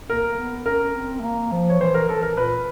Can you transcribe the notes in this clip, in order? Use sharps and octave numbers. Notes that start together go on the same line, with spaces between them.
A#3 A#4
A#3
B3
C#4 A#4
C4
A3
A#3
F3
C#5
E3 C5
A#4
E3 A4
A#4
A#2 B4